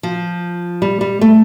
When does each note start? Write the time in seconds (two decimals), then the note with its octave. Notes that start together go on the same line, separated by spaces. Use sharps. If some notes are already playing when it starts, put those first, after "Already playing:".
0.03 F3
0.82 G3
1.01 G3
1.21 A3